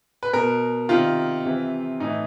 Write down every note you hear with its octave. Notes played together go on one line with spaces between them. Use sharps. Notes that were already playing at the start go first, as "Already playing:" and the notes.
B4
B2 A#4
C3 D#3 F4
C3 E3
A2 E3 D#4